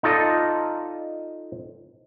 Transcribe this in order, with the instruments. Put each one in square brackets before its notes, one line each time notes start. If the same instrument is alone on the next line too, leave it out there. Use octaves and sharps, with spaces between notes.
[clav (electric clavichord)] D#4 F4 A4 D5 D#5